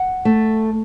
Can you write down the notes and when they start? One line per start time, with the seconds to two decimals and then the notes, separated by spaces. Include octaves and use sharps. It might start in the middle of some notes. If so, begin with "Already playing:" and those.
Already playing: F#5
0.25 A3